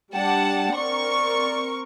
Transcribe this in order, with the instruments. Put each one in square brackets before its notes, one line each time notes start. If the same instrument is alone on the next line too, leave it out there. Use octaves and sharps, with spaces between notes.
[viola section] G3 D4 [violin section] F#5 A5 [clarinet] G5
[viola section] C4 A#4 [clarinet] D5 [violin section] C#6